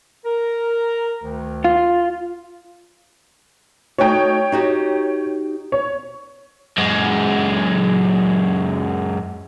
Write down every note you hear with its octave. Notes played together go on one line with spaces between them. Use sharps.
A#4
D2 D#3
F4
A3 D#4 F#4 C#5 G5
D#4 F#4 G4
C#5
F#2 G#3